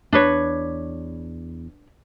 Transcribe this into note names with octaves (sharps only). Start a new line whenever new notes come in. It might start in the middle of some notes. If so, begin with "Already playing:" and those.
E2 D4 B4 C#5